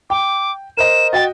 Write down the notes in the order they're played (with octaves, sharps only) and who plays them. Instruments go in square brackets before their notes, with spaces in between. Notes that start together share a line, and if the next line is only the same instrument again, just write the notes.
[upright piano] G5 [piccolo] D6
[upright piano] A#4 C5 D#5 [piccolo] E7
[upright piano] F#4 D#5 G5 [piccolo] A6